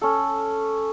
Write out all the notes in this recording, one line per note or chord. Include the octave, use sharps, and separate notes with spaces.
C#4 A4